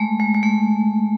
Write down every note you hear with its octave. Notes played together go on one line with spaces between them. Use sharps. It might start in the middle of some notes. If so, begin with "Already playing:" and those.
Already playing: G#3 A3
G#3
G#3
A3